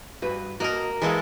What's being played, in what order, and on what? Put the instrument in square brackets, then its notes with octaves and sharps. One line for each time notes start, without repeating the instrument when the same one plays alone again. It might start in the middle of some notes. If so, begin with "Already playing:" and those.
[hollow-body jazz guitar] G2 F#4 B4
[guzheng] A#3 A#4 [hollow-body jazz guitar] F#4 D#5
[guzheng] E3 G#3 A4 [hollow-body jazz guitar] G#4 D#5 F5